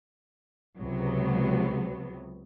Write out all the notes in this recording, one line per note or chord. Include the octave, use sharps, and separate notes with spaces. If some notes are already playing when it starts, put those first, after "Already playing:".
C#2 C3 F#3 B3